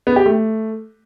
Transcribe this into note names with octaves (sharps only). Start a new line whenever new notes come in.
B3
G4
A3